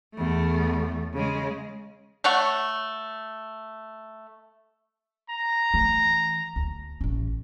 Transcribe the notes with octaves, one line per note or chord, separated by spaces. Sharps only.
E2 A3
C#3 G#3
A3 C#5 F#5
A#5
E3 A3
D2
A1 C#4